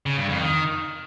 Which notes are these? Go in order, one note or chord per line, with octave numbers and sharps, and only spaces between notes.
C#3
G2
F2
D#3